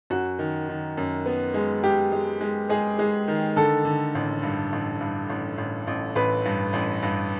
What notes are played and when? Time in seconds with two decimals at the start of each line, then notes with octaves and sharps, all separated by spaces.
0.10 F#2 F#4
0.39 D#3
0.69 D#3
0.97 F#2
1.26 B3
1.54 G#3
1.83 G#3 G4
2.12 G#3
2.41 G#3
2.69 G#3 G#4
2.99 G#3
3.28 D#3
3.56 D3 A4
3.85 D3
4.15 A1
4.43 G2
4.72 A1
5.01 G2
5.29 A1
5.58 A1
5.87 A1
6.15 A1 B4
6.45 G2
6.73 A1
7.03 G2